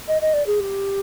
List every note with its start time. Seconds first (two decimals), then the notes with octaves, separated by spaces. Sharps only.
0.08 D#5
0.21 D#5
0.33 D5
0.46 G#4
0.59 G4